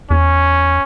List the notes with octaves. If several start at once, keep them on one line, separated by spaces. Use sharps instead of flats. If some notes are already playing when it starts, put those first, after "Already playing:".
E2 C#4